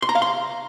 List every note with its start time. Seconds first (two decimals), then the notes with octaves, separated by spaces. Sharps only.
0.02 C6
0.09 A#5
0.15 F5
0.22 C6